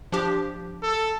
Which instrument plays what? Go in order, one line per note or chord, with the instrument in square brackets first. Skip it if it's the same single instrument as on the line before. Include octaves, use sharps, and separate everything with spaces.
[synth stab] F3 D4 G4
[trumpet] A4